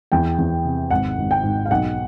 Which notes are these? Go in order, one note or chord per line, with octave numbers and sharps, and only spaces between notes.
E2 G5
E2
C3
G#1 F#5
G#1
G5
G#2
F5
B1 F#5